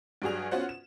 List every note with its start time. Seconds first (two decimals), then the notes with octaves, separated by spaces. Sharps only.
0.22 G2 F#3 G3 F#4 G#4 F7
0.51 B3 C#4 F4 F#4 C5 F#5
0.69 E7